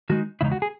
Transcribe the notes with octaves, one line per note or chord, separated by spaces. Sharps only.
D#3 G#3 D#4 F#4
E2 C#3 G#3 D#4 E4
F#4
G#4